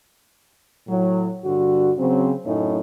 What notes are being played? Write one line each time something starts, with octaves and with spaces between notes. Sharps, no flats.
A2 F#3
G2 D3 F#4
C#3 F#3 C4
F#2 A2 A3 C#4 D#4